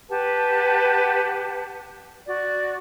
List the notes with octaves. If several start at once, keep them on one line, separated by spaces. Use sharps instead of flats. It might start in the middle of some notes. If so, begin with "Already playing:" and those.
G4 B4 F#5 A5
F#4 D5